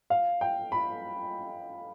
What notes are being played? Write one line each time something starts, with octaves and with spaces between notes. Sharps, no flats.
F5
G5
B5